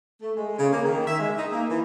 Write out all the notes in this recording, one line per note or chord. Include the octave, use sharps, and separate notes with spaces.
A3
G#3
C#3
A#3
D#3
E5
G#3
D#4
A#3
E3